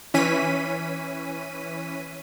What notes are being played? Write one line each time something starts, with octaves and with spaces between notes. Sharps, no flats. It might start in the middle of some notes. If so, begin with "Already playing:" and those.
E3 C#4 B6 D#7